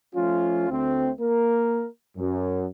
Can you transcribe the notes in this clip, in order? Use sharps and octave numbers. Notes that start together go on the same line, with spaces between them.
F3 A3 C#4 F4
D2 A3 C4
A#3 A#4
F#2